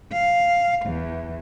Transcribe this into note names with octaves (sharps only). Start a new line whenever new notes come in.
F5
E2